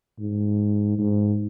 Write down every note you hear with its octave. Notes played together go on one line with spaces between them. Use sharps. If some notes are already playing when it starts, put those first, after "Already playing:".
G#2
G#2